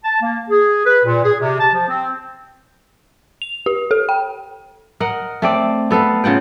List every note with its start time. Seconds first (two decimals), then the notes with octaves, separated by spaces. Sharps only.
0.04 A5
0.22 A#3
0.50 G#4
0.86 B4
1.05 A#2
1.24 G#4
1.40 C3
1.60 A5
1.73 F3
1.89 C4
3.42 F7
3.66 G4
3.91 A4
4.09 G5
5.00 A#4 D#5 F#5
5.42 A3 C4 D5
5.91 B3 A4 B4 F5
6.24 C#3 F4 F#5 G5